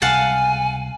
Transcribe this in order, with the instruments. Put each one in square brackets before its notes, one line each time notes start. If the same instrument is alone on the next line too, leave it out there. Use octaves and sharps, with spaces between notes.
[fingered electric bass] C#2 C3 G3 [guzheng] F5 F#5 A5 [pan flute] G#5